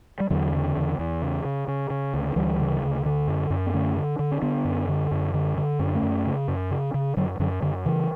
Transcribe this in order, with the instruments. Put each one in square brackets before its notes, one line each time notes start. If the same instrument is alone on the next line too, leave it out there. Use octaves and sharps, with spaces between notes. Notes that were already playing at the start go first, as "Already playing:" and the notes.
[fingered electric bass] G3
E2 D3 F#3
C#3
E2
E2
C#3
C#3
C#3
C#3
D2
D2 E3 G3
C#3
D2
D3
F#2
F#2
B3
D3 A3 C#4
D3
D3
C#4
D3 B3 D4
F#2
D3
F#2
D3
D3
F#2 C#4
D4
A3 C#4
F#2
C#3
F#2
C#3
C#3
F#2 D3 F#3
F#2 D3 F#3
F#2 D3
C#3 E3